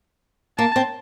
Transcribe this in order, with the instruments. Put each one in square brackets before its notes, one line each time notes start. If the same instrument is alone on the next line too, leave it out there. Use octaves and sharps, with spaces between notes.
[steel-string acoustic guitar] A#3 [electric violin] A5
[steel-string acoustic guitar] C4